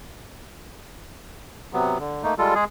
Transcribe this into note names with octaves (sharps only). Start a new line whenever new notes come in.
C3 F#3 B3
D3
A3 A#3 D#4
G3 G#3 F4 A4
G#3 G#4